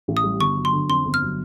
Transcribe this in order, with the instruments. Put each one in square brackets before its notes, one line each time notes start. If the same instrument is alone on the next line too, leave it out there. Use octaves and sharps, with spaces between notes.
[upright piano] A1
[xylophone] D#6
[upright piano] G3
[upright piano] G1 [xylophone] C#6
[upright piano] F#3
[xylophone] C6
[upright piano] D3
[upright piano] F2 [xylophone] C6
[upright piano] G1
[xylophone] F6
[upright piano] F#3